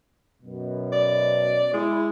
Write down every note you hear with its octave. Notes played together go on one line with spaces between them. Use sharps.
F#2 B2
D5
G#3 E4